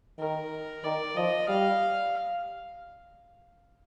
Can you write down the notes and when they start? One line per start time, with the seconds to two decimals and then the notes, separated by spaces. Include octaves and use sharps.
0.19 D#3 A#4
0.84 D#3 D5
1.16 F3 D#5
1.48 G3 F5